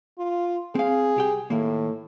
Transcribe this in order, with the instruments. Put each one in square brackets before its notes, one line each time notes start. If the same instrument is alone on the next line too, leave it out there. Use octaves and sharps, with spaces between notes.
[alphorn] F4
[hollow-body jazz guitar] C4 F5 [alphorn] G#4
[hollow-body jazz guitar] C2 G4 G5
[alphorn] A2 [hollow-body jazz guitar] D#3 A#3